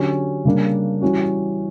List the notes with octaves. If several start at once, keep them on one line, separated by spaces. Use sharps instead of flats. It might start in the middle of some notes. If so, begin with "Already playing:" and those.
Already playing: D3 F#3 C#4 G4
C#3 G3 A#3 D4
E3 G3 C#4 F#4